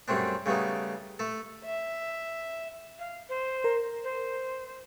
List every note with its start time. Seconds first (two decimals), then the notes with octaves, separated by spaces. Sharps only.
0.08 F#2 G3 A3 C4 D4
0.46 C#3 G3 A3 B3 D#4
1.19 A3 A4
1.64 E5
2.99 F5
3.29 C5
3.64 A#4
4.04 C5